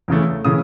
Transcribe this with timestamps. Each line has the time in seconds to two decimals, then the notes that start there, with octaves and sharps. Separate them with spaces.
0.08 E2 C#3 E3 A3
0.45 C#3 E3 A3 D#6